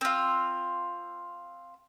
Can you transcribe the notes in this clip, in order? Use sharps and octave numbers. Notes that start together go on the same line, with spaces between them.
C4 F4